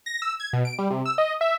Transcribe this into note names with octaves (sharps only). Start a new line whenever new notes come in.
A#6
E6
G#6
B2
D7
G3
C3
E6
D#5
E5